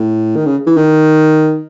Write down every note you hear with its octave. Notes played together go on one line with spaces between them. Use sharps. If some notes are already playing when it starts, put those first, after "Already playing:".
Already playing: A2
D#3
C#3
E3
D#3